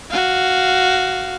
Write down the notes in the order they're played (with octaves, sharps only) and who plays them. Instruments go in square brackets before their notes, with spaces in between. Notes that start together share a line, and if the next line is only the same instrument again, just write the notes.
[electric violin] F#4 F5